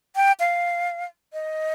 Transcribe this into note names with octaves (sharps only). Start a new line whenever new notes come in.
G5
F5
D#5